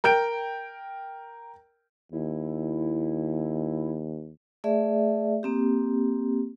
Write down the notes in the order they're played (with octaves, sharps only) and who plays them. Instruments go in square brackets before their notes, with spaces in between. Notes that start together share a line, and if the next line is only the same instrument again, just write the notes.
[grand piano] A#4 G5 G6 D7
[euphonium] D#2 [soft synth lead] E4
[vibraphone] A3 G#4 D5 E5
A#3 C4 G4